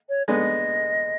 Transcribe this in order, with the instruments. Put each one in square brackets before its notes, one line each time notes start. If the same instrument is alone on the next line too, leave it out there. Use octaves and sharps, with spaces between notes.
[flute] C#5
[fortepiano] G#3 B3 D4 [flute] D#5